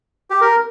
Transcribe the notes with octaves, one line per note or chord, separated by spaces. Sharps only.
G4
A#4